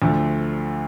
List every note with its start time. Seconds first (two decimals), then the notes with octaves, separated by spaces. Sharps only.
0.02 D2 D3 F3 A3